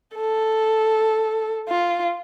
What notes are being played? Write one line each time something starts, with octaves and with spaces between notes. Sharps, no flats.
A4
F4